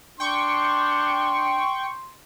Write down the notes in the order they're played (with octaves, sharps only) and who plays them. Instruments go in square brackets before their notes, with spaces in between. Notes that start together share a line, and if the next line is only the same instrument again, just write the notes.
[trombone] D4 [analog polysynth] G5 C#6 [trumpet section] C6